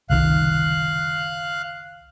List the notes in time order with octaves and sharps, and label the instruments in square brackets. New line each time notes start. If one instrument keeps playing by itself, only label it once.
[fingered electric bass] F#1 C2 D#3 [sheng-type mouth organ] F5 F#6